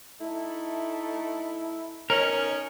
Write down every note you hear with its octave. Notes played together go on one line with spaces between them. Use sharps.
A3 D#4 E4 A4
B2 C#4 D#4 A#4